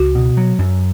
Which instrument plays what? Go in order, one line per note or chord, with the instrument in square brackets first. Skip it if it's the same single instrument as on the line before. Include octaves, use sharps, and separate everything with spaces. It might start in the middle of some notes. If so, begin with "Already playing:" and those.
Already playing: [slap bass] C#2 [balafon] F#4
[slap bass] B2
F#3
F#2